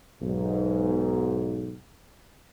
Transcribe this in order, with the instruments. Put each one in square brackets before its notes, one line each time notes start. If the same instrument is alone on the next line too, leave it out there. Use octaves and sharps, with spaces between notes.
[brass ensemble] B1 G#2